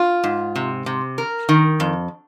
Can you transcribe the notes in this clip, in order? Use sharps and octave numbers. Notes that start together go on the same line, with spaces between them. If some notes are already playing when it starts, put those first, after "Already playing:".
Already playing: F4
G#2
C3
C3
A#4
D#3
F2